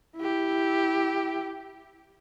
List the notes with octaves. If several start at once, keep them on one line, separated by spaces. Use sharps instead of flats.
E4 G4